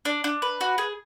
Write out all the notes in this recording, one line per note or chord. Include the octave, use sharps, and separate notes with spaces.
D4
D4
B4
F#4
G#4